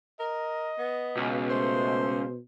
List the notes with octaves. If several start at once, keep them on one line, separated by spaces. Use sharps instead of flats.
A#4 D#5
B3
C#2 B2
A3 C5